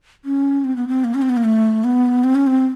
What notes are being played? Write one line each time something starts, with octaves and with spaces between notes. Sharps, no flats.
C#4
C4
B3
C4
A#3
C#4
C4
B3
A#3
A3
B3
C4
C#4
C4